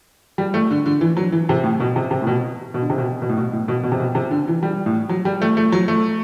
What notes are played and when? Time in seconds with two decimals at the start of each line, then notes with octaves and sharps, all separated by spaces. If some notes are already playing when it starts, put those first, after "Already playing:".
0.38 G3
0.54 A3
0.71 D3
0.86 D3
1.01 E3
1.17 F#3
1.32 E3
1.49 C3
1.64 A2
1.80 B2
1.96 C3
2.11 C3
2.22 A2
2.27 B2
2.74 B2
2.82 D3
2.90 C3
2.98 B2
3.22 B2
3.29 A2
3.37 B2
3.53 A2
3.68 B2
3.83 B2
3.92 C3
4.00 B2
4.15 C3
4.31 D3
4.47 E3
4.63 G3
4.86 A2
5.09 F#3
5.25 G3
5.42 A3
5.57 A3
5.72 F#3
5.88 A3